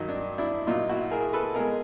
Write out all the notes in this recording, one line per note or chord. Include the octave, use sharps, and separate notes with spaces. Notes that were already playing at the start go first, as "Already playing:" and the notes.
Already playing: G2 D#3 F#3 D#4
D4
D4 E4
A#2 F#3 D#4 F4
E4 F#4
G#4 A#4
A4 B4
B2 G#3 G#4 A#4